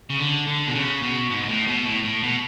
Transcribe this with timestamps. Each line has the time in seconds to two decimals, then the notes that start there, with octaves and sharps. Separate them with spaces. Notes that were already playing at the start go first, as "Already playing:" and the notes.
0.10 C#3
0.19 D3
0.47 D3
0.67 B2
0.75 C#3
1.02 B2
1.30 G#2
1.43 B2
1.49 A2
1.68 B2
1.86 A2
2.04 A2
2.23 B2